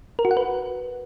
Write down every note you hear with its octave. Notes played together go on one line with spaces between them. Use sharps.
A#4
F#4
F#5
B4